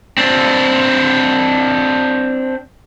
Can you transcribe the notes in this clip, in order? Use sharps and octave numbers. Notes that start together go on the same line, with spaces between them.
C4 D4